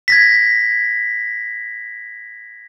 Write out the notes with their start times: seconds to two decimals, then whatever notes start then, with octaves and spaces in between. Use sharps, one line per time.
0.08 G#6 A#6 B6